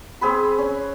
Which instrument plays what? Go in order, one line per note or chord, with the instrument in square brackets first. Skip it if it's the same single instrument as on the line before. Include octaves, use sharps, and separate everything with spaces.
[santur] C4 G#4 B4 B5
C#4